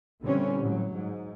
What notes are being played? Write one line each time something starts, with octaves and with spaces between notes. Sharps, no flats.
A#2 D3 E3 G3 C4 C#4
A2 F#3
G#2